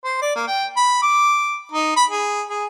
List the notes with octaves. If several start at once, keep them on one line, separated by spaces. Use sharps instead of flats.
C5
D5
A#3
G5
B5
D6
D#4
B5
G#4
G#4